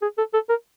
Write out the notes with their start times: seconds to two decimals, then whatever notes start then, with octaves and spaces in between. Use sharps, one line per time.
0.02 G#4
0.18 A4
0.33 A4
0.49 A#4